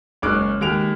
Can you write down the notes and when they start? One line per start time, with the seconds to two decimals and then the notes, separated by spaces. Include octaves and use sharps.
0.22 F#1 G#3 C#4 D6 F#6 D7
0.61 D#2 G#3 D7 F7